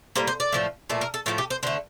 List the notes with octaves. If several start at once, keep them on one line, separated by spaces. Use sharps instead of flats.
A2 G3 A#3 C5
C5
D5
A2 F3 A3
A#2 F3 A3
A#4
A4
A2 F3 A3 F4
G4
C5
D3 A3 C5